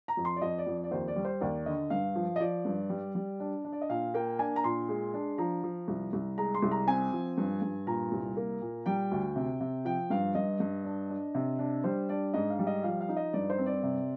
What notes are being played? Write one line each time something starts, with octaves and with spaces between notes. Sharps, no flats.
A#5
F2
C6
D5
F2 D#5
D5
F2
D5
D#2 C5
D5
G3
C5
D#2 D5
D3 D#5
G2 F5
F3
D#5
F3 D5
G2
G3
G3
D4
D4
D5
D#5
A#2 F5
A#3 G5
D4 G#5
A#5
A#2 C6
G#3
D4
F3 A#5
F3
C2
C2
G#3 A#5
C6
C2
A#5
C4 G#5
F3
G2
G2
A#2 A#5
C2
A#3
A#2
G3 G5
D2
C3
C3
F3 G5
G2 F5
G2 D#5
G2
D4
D4
C3
D4
G3 C5
D4 D5
G#2 D#5
F5
G3
D#5
F3 F5
F5
D#4
D#5
G2 D5
C5
C4
D5
C3